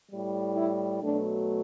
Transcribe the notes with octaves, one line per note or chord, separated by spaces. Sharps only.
A2 G3
E4
B2 F#3 A3 D4